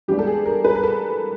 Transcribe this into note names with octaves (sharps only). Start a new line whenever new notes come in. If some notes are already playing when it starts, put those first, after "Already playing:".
G2 E3 G#3 B3 D4 G4
A4
G#4
A#4
B4
A#4
A4